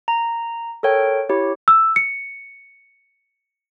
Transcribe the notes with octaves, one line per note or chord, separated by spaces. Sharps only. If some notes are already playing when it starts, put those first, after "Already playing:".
A#5
A4 A#4 C#5 G5
E4 G4 C#5
E6
C#7